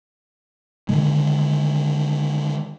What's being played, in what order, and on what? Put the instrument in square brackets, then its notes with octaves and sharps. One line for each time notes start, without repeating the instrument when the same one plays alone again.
[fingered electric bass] D3 D#3 G#3